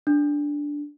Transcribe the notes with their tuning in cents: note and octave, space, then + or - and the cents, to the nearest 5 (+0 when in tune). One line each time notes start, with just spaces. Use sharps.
D4 -5